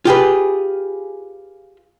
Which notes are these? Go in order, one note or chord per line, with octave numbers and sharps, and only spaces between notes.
F4 G4 G#4 B4